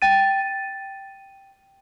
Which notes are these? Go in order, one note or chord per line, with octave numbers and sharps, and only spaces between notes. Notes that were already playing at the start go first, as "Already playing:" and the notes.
G5 A6 D#7